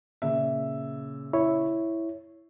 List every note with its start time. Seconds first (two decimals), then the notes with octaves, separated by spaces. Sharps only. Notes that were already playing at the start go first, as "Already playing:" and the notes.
0.22 A#2 C#3 E5
1.33 E4 C#5